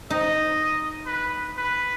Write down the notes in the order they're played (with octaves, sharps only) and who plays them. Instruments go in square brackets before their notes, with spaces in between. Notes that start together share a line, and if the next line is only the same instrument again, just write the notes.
[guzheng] D#4 [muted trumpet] D#5
[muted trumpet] B4
B4